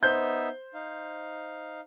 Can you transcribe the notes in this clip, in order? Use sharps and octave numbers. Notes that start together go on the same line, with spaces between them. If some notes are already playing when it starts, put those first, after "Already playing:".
B3 D#4 C5 E5 G6
D#4 F5